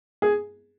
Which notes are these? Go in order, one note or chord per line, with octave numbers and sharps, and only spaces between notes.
G#4